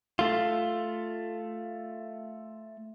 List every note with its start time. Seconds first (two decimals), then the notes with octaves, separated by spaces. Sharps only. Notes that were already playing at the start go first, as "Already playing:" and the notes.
0.19 A3 F4